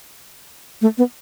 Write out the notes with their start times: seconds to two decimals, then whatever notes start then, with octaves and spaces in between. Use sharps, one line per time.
0.82 A3
0.98 B3